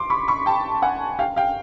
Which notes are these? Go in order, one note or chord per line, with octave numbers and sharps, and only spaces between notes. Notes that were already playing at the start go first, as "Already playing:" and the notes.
Already playing: C6 D6
B5 C#6
B5 C#6
G5 A5
F#5 G#5
F5 G5
F5 G5